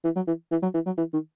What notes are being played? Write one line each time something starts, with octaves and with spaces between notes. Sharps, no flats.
E3
F#3
E3
E3
F#3
E3
F#3
E3
D#3